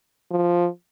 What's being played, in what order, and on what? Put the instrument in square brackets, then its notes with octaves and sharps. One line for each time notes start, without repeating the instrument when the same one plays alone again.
[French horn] F3